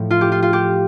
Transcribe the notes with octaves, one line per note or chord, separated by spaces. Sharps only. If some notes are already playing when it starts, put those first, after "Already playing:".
Already playing: A2 F3
F4
G4
F4
F4
G4